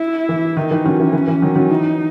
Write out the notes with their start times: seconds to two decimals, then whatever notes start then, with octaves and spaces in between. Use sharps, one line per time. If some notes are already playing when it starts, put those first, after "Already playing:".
Already playing: E4
0.29 E3
0.57 D#3 D#4
0.71 E3
0.85 D#3 F#3 C#4
1.00 E3
1.13 E3
1.28 E3
1.42 D#3 F#3
1.55 D#3 F#3
1.71 E3 D#4